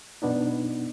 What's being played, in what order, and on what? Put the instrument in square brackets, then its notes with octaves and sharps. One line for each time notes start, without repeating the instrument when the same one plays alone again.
[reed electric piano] F#2 B2 B3 D4 D#4